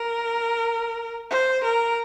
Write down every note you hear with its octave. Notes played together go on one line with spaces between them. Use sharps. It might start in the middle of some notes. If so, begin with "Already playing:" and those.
Already playing: A#4
C5
A#4